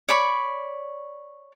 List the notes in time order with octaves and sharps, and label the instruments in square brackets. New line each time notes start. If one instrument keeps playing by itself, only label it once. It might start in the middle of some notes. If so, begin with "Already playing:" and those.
[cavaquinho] C#5 D5 B5 C#6